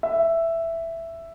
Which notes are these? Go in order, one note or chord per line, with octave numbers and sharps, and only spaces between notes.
E5